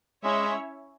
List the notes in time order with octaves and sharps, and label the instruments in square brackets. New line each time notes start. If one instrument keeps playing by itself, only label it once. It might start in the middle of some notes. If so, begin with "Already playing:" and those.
[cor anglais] G#3 [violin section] C#4 E4 C#5 E5